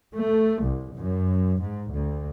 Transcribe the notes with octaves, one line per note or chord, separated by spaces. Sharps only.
A3
C2
F#2
G#2
D2